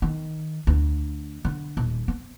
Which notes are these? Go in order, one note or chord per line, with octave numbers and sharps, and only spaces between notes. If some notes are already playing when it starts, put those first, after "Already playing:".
D#3
D2
D3
D#1
C4